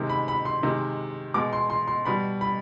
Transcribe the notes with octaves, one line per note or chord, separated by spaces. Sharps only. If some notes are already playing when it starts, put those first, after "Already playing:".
Already playing: C3 D#3 G#3
B5
B5
C6
C3 D#3 G#3
B2 G#3 D6
C6
C6
C6
B2 G3 B5
B5